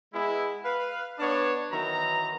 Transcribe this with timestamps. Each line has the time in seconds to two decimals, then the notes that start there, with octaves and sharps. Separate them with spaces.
0.13 G#3 B3 E4
0.64 B4 F5
1.19 B3 D4 C#5
1.71 D#3 E3 F#3 B3 A#5